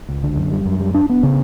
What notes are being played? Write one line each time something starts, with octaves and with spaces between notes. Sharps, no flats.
C#2
D3
F#2
G3
F#2
G3
D4
B3
C#3